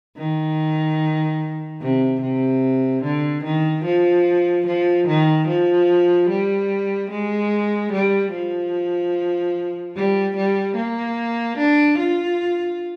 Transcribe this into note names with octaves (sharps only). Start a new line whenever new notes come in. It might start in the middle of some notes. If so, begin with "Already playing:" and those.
D#3
C3
C3
D3
D#3
F3
F3
D#3
F3
G3
G#3
G3
F3
G3
G3
A#3
D4
F4